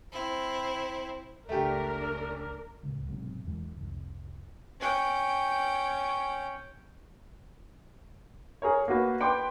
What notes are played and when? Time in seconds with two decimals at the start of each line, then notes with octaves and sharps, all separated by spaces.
0.12 C4 E4
1.49 G1 C#2 A3 D4 G4 A#4
2.83 D1 C#2
3.07 B1 G#2 C3
3.45 E2 E3 G#3
3.77 C2 F2
4.80 C#4 G5
8.62 G#4 A#4 C#5
8.88 A#3 F#4 B4
9.20 B4 G5 C6 D6